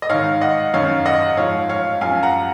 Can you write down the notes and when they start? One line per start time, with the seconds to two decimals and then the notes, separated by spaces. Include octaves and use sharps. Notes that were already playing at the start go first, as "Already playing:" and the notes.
0.02 D#5
0.09 G#2 D#3 C#5 F5
0.41 D#5 F#5
0.74 F#2 D#3 C#5 F5
1.05 D#5 F#5
1.37 G#2 F3 C#5 F5
1.69 C#5 F5
2.01 F#2 F3 F5 G#5
2.23 F#5 A#5